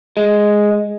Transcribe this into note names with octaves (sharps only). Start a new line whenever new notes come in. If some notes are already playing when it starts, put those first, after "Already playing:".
G#3